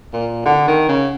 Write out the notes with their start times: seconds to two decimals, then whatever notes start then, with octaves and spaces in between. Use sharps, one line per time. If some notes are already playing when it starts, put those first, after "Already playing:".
0.13 A#2
0.45 D3 F#5
0.68 D#3
0.89 C#3